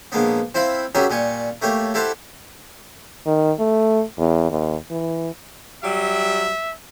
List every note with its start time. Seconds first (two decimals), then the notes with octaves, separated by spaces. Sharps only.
0.12 A#1 G#3 A#3 B3
0.55 C4 E4 C5 F5 B5
0.95 F#3 C#4 G4 G#4 A#4 E5
1.10 A#2 G3 G#5 C#6
1.62 A3 A#3 G4 C#5
1.94 E4 G4 A4 C5 F#5
3.26 D#3
3.59 A3
4.18 E2
4.50 D#2
4.91 E3
5.84 F#3 G3 E5